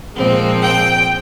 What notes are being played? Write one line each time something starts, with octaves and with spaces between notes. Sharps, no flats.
A#2 F3 G#3 C4
G5